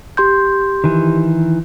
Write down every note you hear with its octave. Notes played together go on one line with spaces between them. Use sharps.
G4 C6 G6
D#3 E3